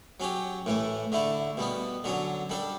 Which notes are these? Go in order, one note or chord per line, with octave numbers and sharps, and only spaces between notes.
F#3 C#4 G4
A2 E3 A3
D3 A3 E4
B2 G3 B3
D3 F#3 C#4
G3 D4 A4